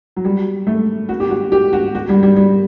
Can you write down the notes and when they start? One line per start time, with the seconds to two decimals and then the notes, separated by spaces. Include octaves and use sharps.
0.17 F#3
0.25 G3
0.67 A3
1.09 F#4
1.20 G4
1.30 F#4
1.52 G4
1.73 F#4
1.95 F#4
2.09 G3
2.23 G3
2.37 G3